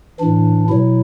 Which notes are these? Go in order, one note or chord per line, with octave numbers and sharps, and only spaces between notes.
A2 E3 D4
B2 F#3 E4